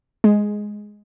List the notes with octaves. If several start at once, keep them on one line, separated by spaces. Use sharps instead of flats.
G#3